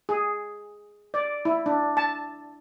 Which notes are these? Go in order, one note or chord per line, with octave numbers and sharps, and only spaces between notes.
G#4
D5
E4
D4
A5